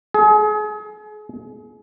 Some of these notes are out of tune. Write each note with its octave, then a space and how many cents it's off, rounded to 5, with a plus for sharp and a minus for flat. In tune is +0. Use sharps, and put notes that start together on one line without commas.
G#4 +35